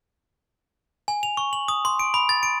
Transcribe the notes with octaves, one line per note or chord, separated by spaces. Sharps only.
G#5
F7
C#6
F#7
D#6
C6
D7
B5
A6
D7